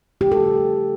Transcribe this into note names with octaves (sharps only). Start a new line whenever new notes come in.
C#3 F3 A3 G4
A4